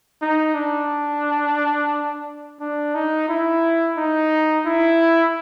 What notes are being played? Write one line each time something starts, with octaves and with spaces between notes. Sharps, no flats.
D#4
D4
D4
D#4
E4
D#4
E4